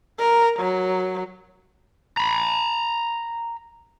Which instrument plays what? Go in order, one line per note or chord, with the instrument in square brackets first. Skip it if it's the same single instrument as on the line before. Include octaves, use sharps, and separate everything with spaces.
[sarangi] A#4
F#3
[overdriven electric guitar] A#5 B5